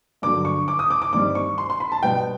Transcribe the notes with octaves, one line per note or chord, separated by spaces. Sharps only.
G2 D3 F#3 D6
C#6
D6
D#6
D6
D6
G2 D#3 G3 C4 D6
C#6
C6
C6
B5
A5
B2 G3 B3 G5